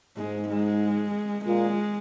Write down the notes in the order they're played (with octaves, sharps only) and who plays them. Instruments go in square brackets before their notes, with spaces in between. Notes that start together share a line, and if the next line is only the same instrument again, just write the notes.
[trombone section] G#2 [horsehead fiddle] G#3
[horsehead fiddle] G#3
[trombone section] A#2 [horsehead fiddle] G#3